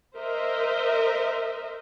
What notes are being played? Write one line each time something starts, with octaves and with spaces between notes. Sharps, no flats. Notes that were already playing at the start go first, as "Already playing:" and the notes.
A#4 C5 D#5 E5